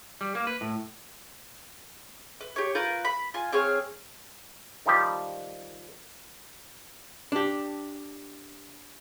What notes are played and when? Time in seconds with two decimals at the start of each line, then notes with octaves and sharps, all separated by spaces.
0.21 G3
0.35 A#3
0.47 B4
0.61 A2
2.41 B4
2.56 G4 C#5
2.75 F4 A#4 B4 G6
3.05 B5
3.34 F4 G#5
3.52 C4 G#4 C#5 F5
4.86 D#3 F3 G3 G4
7.32 D4 G4